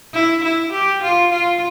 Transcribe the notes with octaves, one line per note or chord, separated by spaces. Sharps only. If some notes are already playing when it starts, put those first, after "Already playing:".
E4
E4
G4
F4
F4